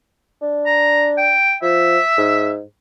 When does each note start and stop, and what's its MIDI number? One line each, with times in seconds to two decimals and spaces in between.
0.42 1.32 62
0.66 1.08 82
1.17 1.55 79
1.63 1.98 53
1.63 2.50 76
2.17 2.61 44